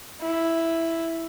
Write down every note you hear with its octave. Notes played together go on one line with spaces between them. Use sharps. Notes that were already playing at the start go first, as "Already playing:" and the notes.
E4